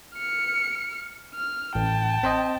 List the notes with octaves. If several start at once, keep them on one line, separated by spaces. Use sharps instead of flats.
F6 C#7
F6
A1 G5 A5
C4 C5 D#5